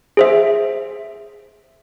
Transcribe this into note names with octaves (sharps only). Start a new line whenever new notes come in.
G#4 C5 E5